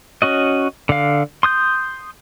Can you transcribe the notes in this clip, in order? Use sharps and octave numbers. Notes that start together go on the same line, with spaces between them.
C#4 F#4 D#5
D3 F5
C6 D#6 G6